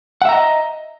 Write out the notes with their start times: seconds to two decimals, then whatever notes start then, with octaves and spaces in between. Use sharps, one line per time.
0.22 F#5
0.25 E5
0.29 A#5
0.32 D#5